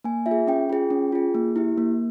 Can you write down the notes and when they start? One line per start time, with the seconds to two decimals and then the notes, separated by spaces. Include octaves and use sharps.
0.04 A#3 G#5
0.26 F4 E5
0.31 G#4
0.47 C#4 G5
0.69 F4 G#4
0.90 C#4
1.12 F4 G#4
1.35 A#3
1.56 E4 G4
1.78 A#3